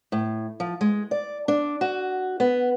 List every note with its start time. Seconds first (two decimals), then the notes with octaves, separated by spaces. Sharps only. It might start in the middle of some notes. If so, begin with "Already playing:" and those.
0.12 A2
0.60 F3
0.81 G#3
1.11 D5
1.48 D4
1.81 F#4
2.40 B3